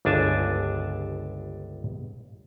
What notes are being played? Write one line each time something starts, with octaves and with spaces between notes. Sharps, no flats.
G1 C#2 D4 G#5 A5